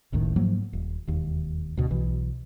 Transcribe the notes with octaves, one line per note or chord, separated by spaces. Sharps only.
F#1 C#2 A2 D#3
G#2 F3 F#3 A#3
D#1
E1 D#2
D2 B2
B1 B2 E3